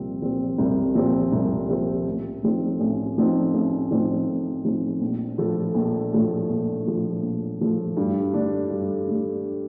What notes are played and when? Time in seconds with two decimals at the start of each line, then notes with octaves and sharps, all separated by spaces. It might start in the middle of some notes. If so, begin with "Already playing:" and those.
Already playing: C2 A#2 F3 C4
0.22 A#2 F3 C4
0.58 C2
0.95 A#2 F3 C4
1.32 C2
1.69 A#2 F3 C4
2.07 A1
2.43 A2 F3 C4 D#4
2.80 A1
3.17 A2 F3 C4 D#4
3.54 A1
3.91 A2 F3 C4 D#4
4.27 A1
4.65 A2 F3 C4 D#4
5.01 A#1
5.38 A2 F3 A3
5.75 A#1
6.12 A2 F3 A3
6.49 A#1
6.86 A2 F3 A3
7.23 A#1
7.59 A2 F3 A3
7.97 G2
8.33 D3 A3 D4
8.70 G2
9.07 D3 A3 D4